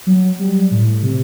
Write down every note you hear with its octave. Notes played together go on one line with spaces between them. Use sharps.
F#3
G3
A2
C3